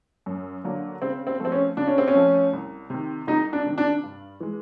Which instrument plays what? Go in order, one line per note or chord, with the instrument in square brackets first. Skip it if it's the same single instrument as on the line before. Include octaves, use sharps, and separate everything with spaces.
[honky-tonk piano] F#2
D3 F#3 A#3 D4
[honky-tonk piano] C#3 [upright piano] C4
[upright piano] C4
[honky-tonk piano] F3 A3 [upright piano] C4
[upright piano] C#4
[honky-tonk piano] C#3 [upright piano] D4
[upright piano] C#4
C4
C#4
[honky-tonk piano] F3 A3
C2
C3 D#3
[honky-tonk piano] C2 [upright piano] D#4
[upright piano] D4
[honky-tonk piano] C3 D#3
[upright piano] D4
[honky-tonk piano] G2
E3 G#3